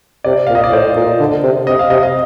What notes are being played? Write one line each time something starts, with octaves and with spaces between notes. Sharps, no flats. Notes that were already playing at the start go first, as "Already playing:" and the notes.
C3 D5
A#2 F5
D#5
D5
A2 C5
A#2
D3
C3
C3 D#5
F5
C3 D#5
D#5